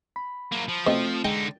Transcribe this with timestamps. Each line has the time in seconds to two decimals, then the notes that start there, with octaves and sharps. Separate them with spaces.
0.16 B5
0.52 F#3 A#3
0.69 F3
0.87 B2 A3 C4
1.25 D3 G#3 D#4 G5